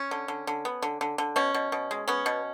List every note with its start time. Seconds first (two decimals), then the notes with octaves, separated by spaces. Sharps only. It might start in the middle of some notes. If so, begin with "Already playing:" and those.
Already playing: C#4
0.11 D3
0.28 D3
0.47 D3
0.65 B3
0.82 D3
1.01 D3
1.18 D3
1.36 B2 C#4
1.54 B2
1.72 B2
1.91 G#3
2.08 B3 C#4
2.26 B2